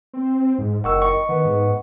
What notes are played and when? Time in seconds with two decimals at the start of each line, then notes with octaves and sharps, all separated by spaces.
0.14 C4
0.59 G#2
0.84 F#1 D#3 F#5 C#6 E6
1.02 D#5 C#6
1.29 D#3 B3
1.45 G#2